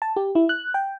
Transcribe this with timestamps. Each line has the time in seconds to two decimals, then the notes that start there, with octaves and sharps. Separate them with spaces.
0.02 A5
0.16 G4
0.35 E4
0.49 F#6
0.74 G5